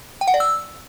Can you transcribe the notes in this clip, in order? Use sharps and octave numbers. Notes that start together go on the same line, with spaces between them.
G5
F#5
D5
E6